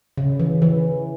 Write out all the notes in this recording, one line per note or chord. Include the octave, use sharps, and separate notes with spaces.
C#3
E3
E3